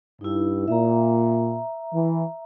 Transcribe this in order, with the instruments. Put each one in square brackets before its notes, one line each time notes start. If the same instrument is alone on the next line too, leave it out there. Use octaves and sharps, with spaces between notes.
[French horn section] G2 [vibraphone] D#4 E4
[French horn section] A#2 [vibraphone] E5 A#5
[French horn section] E3